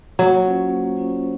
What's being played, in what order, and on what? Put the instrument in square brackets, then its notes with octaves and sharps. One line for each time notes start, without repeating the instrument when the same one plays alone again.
[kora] F#3 [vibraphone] A#3
[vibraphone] C#4 F4 C5
A#3
C#4 F4 C5